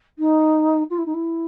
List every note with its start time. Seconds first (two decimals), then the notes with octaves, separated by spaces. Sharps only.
0.18 D#4
0.90 F4
0.98 E4
1.05 D#4
1.13 E4